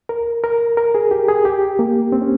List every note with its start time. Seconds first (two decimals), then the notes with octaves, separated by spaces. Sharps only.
0.09 A#4
0.44 A#4
0.77 A#4
0.95 G#4
1.11 G4
1.28 G#4
1.45 G4
1.79 A#3
2.12 C4
2.22 C#4